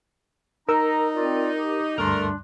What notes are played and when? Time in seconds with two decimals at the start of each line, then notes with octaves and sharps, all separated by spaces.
0.69 D#4 A#4 A#5 E6
1.15 C4 F4 D5
1.57 G4
1.98 D2 G2 G3 A3 D4 A#4 C6